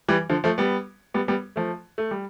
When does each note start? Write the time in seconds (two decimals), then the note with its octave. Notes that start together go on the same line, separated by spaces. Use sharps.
0.08 E3 G3
0.30 D3 F3
0.44 F3 A3
0.58 G3 B3
1.14 G3 B3
1.28 G3 B3
1.56 F3 A3
1.98 A3
2.11 G3